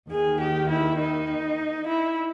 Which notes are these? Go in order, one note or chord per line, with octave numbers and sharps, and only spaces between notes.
D#2 D#3 G#4
G4
E4
D#4
E4